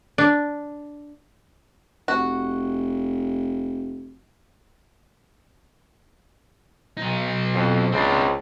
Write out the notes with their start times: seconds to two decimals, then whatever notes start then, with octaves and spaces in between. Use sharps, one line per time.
0.18 D4
2.08 F1 F#4
6.97 B1 D#4
7.54 F2
7.92 C#2 C4 D4